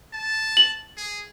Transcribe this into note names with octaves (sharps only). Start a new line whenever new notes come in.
A5
F#7
G#4